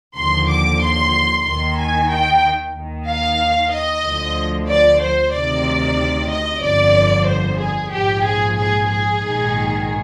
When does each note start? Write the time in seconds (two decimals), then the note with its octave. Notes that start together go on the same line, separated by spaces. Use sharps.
0.16 D#2 D3 F3 C6
0.49 D6
0.81 C6
1.45 D#2 D#3 C6
1.77 G#5
2.10 G5
2.74 D#2 D#3
3.07 F5
3.72 D#5
4.04 D2 D3 F3
4.68 D5
5.00 C5
5.33 D2 C3 D#3 D5
6.29 D#5
6.61 G1 F2 D3 F3 D5
7.26 C5
7.58 G#4
7.91 A#1 G#2 F3 G4
8.23 G#4
8.55 G#4
8.88 G#4
9.20 A#1 G#2 D#3